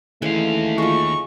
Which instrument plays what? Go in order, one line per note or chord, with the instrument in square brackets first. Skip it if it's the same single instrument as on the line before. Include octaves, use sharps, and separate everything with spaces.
[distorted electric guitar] D#2 F5 [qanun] E3 G#3 C#4 [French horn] A3
[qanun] G#3 F4 [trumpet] C#6